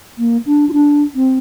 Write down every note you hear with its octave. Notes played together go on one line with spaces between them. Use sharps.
A#3
D4
F4
D4
C4